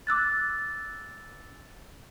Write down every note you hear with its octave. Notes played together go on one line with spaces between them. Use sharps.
D6 E6 F#6 A6